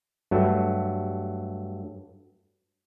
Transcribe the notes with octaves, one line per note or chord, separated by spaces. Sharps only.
G2 F#3 A3